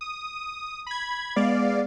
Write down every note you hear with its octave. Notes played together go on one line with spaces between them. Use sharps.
D#6
B5 G#6
G#3 B3 D5 F5